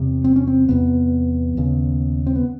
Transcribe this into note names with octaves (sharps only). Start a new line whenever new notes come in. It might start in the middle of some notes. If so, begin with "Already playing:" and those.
Already playing: E2 C3
C4
C#4
C4
E2 C3 B3
D#2 C#3
C4
B3